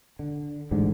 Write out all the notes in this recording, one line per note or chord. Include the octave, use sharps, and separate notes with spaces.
D3
A1 G#2 D3